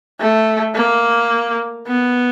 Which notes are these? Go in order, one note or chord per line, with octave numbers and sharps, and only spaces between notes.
A3
A#3
B3